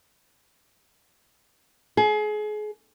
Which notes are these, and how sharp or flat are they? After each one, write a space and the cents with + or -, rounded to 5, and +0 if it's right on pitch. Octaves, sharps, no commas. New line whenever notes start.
G#4 +30